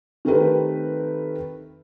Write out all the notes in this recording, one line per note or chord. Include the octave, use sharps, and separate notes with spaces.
D#3 A3 C4 G4 A#4 B4